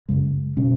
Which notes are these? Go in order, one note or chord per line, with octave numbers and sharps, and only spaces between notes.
F#2 C#3 G#3
B2 G#3 C#4